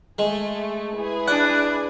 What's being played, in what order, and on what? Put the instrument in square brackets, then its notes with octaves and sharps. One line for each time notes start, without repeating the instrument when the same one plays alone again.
[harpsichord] G#3 [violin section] A3 G#4
[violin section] E4 G#4 B4
[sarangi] D4 [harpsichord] F#5 [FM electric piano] F#6